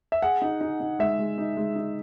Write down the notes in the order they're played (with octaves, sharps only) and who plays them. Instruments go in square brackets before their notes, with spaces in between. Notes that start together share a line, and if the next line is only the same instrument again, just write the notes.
[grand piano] E5
[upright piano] G#4 [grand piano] F#5
[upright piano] D#4
D#4
D#4
[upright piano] G#3 [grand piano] E5
[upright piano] G#3
D#4
G#3
D#4